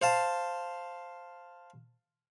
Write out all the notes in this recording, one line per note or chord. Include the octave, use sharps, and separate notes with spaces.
C5 F5 A5